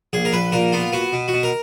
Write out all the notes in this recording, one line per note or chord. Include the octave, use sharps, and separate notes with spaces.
A#1 G#4
A#4
A#1 B4
A#2 A#4
B3 F4
B3 F#4
B2
F#4
B2
A#4